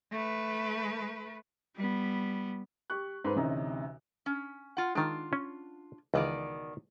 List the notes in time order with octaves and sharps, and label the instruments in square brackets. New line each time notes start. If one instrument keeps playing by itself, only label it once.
[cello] A3 B4
G3 B3
[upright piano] G4 C#6 F#6
G#2 B4 C5
A1 D2 C3 C#4 D#4 A#5
[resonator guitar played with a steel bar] C#4
F4 F#5
[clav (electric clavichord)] D#3 G#3 [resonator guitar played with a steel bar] D4 F4
[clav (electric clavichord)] C#4
[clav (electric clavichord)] C#2 E3 [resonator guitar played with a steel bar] B2 D#3 D5